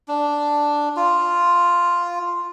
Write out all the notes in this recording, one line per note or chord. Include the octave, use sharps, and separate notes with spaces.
D4
F4